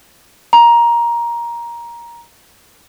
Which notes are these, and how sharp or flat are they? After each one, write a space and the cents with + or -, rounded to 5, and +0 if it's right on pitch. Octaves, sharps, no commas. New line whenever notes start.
A#5 +15